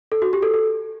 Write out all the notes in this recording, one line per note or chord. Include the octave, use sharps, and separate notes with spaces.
A4
F#4
G4
A4
A4